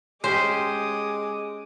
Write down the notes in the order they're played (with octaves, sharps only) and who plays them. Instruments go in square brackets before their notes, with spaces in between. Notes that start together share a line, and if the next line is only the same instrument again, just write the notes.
[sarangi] G#3 [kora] C#4 G4 [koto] C5 [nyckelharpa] D6 D#6